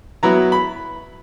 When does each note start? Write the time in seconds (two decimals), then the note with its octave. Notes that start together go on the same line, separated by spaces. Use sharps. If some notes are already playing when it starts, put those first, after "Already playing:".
0.23 F#3 B3 E4 A#5
0.52 B5